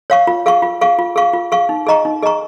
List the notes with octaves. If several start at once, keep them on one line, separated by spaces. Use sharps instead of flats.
C#5 F5 C#6
F4
G#4 F5 C#6
F4
G#4 F5 C#6
F4
G#4 F5 C#6
F4
G#4 F5 C#6
D#4
G#4 D#5 A#5 C#6
D#4
G#4 D#5 A#5 C#6